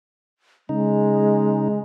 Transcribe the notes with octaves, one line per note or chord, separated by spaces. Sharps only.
C#3 G#3 D#4